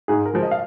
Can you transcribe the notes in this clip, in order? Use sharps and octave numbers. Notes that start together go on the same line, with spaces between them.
G#2 G#4
A#4
F3 G#3
D#5
F5